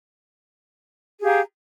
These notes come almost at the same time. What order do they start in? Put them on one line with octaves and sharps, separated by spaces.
G#4 G4 F5 A#5